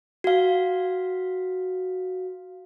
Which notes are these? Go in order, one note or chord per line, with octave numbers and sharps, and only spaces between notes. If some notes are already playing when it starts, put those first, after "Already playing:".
F#4 F5